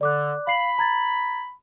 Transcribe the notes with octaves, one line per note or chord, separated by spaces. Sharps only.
D3 D5 D6 F#6
F5 B5 C7 F#7
A#5 G#6 A6